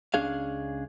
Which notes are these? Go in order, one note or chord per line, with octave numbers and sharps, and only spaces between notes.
C#2 C#4 D4 G#4 F5